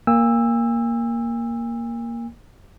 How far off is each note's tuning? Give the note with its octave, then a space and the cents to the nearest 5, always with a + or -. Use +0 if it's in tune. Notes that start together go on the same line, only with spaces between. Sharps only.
A#3 +0 G#5 -45 E6 +0